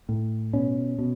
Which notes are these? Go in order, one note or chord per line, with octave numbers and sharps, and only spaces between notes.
A2
B2 C#4
B2